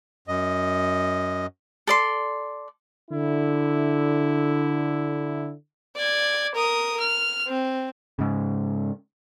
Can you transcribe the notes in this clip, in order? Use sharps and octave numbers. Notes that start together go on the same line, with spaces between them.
F#2 D#5
A4 D5 C6
D3 E4
D5 G#6
A#4 D#6
F6
C4
G#2 C#3